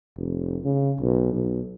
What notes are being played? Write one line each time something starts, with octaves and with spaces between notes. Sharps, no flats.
F1
C#3
B1
B1